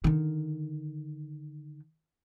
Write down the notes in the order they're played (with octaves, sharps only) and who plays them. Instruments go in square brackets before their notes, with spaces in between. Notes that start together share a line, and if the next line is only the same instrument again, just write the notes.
[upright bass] D3 D#3